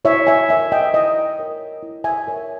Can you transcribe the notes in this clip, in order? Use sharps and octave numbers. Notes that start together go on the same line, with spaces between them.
E4 C#5 E5
E5 G#5
A#4 C#5 E5 G#5
D#5 G5
E4 D#5
A#4 C#5
E4
E5 G#5
A#4 C#5